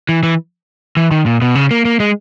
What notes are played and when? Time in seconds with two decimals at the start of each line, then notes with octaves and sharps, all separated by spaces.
0.09 E3
0.23 E3
0.97 E3
1.11 D#3
1.26 A#2
1.42 B2
1.55 C#3
1.71 A#3
1.85 A#3
2.00 G#3